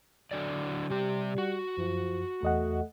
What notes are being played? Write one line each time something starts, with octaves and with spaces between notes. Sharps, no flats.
D3 F#3 D5
C3 G3 G4
F#4
F#2 F3
E2 A3 D#5 F#5